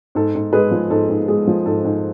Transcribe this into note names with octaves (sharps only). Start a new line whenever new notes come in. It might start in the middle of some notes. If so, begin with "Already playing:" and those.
G#2 A4
G#2
G#3 G#4 B4
F3
G#2 A4
G#2
G#3 G#4
F3
G#2 A4
G#2